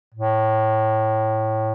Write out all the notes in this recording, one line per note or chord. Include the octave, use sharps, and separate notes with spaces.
A2